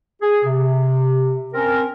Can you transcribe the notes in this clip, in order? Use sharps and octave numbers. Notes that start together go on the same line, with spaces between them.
G#4
C3
C4 C#4 A#4